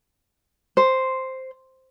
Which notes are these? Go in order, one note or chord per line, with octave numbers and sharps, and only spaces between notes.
C5